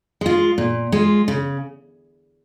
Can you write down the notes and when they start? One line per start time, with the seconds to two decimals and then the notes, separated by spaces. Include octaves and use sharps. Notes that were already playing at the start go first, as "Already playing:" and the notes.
0.21 G#3 F4
0.58 A#2
0.92 G#3 F4
1.28 C#3